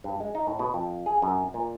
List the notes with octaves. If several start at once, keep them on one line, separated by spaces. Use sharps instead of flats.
G2
G#3
D#4
A2
B2
F2
G#4
F#2
A#2